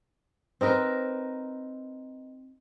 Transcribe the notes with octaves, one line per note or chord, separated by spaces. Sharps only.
C4 D#4 A#4 B4